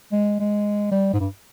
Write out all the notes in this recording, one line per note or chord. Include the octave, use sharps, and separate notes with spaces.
G#3
G#3
G3
G#2
G2